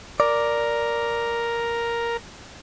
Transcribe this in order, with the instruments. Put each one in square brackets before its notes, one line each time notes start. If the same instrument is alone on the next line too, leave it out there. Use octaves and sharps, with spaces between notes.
[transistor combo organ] A#4 [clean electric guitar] D5